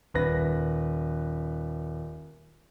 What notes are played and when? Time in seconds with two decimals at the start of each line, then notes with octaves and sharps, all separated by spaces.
0.14 D#1 B4 A#6